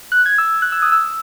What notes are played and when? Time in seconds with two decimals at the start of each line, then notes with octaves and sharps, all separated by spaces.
0.12 F#6
0.26 G#6
0.38 E6
0.62 F#6
0.72 E6
0.82 D#6
0.92 E6